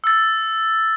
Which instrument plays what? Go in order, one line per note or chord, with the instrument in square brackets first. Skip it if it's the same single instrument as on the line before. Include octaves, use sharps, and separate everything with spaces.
[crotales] E6 A6